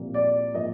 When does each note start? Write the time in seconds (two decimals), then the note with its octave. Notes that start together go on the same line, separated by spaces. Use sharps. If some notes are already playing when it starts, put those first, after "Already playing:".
Already playing: C2 A#2 F3 A#3
0.14 D5
0.54 A#2 F3 A#3 D#5